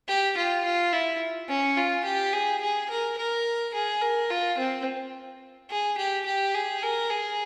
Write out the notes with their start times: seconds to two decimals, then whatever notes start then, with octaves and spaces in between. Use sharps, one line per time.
0.08 G4
0.37 F4
0.65 F4
0.93 E4
1.49 C#4
1.77 F4
2.05 G4
2.33 G#4
2.61 G#4
2.90 A#4
3.18 A#4
3.74 G#4
4.01 A#4
4.30 F4
4.58 C4
5.70 G#4
5.98 G4
6.26 G4
6.54 G#4
6.82 A#4
7.10 G#4